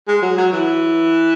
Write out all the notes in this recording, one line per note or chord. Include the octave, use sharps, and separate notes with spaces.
G#3
F#3
F#3
E3